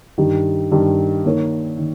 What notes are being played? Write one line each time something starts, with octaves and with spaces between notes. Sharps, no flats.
G2 D#3 G3
G2 D#3 G3
D#3 A#3 D#4 A#4 C#5
D#3